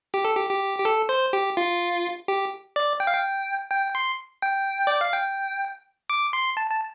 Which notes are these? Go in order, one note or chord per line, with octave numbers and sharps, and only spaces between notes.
G4
A4
G4
G4
G4
A4
C5
G4
F4
G4
D5
G5
F5
G5
G5
C6
G5
D5
F5
G5
D6
C6
A5
A5